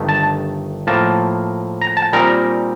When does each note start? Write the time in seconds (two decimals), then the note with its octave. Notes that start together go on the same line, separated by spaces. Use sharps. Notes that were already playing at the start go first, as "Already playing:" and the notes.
Already playing: G1 G2 D#3 A3 D4
0.09 A5
0.87 A2 F3 A#3 A5
1.82 A#5
1.97 A5
2.13 A#2 G3 C4 D#4 A#4